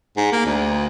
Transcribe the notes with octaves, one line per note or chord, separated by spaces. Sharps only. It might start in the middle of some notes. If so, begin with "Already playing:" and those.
G#2
A#3
D2